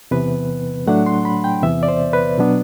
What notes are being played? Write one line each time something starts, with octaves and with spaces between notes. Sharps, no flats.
E2 C3 E3 B3 B4
A2 F#3 A3 D4 F#5
C6
B5
G5
E2 C3 E3 B3 E5
D5
C5
B4
B2 F#3 B3 D4